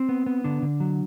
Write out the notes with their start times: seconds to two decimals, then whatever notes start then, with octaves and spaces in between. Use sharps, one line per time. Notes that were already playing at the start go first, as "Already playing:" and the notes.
Already playing: C4
0.09 B3
0.26 B3
0.44 D3 D4
0.62 D3
0.80 F#3